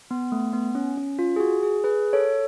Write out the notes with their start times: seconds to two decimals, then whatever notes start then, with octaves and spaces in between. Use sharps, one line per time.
0.11 B3
0.32 A3
0.53 B3
0.75 C#4
0.98 C#4
1.19 F4
1.36 G#4
1.40 F#4
1.63 G#4
1.84 G#4 B4
2.13 A4 C#5